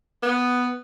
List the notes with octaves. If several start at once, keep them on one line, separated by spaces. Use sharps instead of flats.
B3